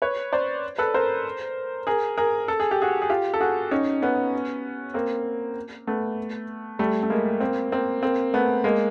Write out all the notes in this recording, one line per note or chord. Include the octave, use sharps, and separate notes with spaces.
B4 C#5
C5 D5
A4 B4
A#4 C5
G#4 A#4
G#4 A#4
A4
G#4
G4
F#4 G#4
G#4
F4 G4
A4
F#4 G#4
C#4 D#4
B3 C#4
A#3 C4
A3 B3
G3 A3
A3
G#3 A#3
A#3 C4
A#3 C4
A#3 C4
A3 B3
G#3 A#3